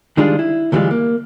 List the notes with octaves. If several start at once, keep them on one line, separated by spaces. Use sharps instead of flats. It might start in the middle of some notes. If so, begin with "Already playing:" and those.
D#3 G3 G#3 D4 F4 G#4
E4
D2 E3 F3 G3 G#3 F4
A#3